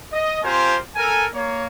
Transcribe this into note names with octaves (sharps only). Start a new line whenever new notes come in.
D#5
C4 F4 G4 A#4 C5 G#5
A4 A#4 G#5
A#3 C#5